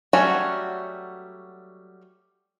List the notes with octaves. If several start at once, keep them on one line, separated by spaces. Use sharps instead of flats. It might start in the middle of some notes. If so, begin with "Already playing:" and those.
F#3 G3 A3 C#4 F#4